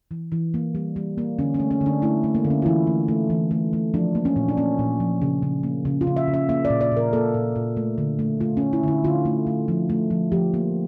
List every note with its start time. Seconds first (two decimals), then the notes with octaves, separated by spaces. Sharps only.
0.11 E3
0.32 E3
0.54 A#3
0.75 G3
0.96 G3
1.18 A#3
1.39 D3 C#4
1.54 C#4
1.60 A3
1.71 C#4
1.81 D3
1.86 D4
2.02 A3 E4
2.24 A3
2.35 A#3
2.45 D3
2.50 C#4
2.62 F4
2.66 E3 E4
2.87 A3
3.08 A3
3.30 E3
3.51 A3
3.73 A3
3.94 F3 D4
4.15 A#3
4.25 C#4
4.36 A#2
4.49 D4
4.57 A#3 C#4
4.79 A#2
5.00 F3
5.22 C#3
5.42 C#3
5.63 A#3
5.85 C#3
6.01 F4
6.07 C#3
6.16 E5
6.28 C#3
6.34 E5
6.49 A#3 E5
6.65 D5
6.70 A#2
6.81 D5
6.92 A#2
6.97 A#4
7.13 A#3 A4
7.34 A#2
7.56 A#2
7.77 A3
7.98 D3
8.19 A3
8.40 A3 F4
8.57 C#4
8.62 A3
8.73 E4
8.83 D3 E4
9.04 D3 F4
9.25 A3
9.47 A3
9.68 F3
9.90 A3
10.10 F3
10.32 F3 G4
10.54 A#3